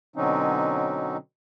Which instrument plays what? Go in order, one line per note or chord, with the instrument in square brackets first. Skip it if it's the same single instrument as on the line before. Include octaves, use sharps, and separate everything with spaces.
[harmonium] B2 D3 F#3 C4 C#4 D#4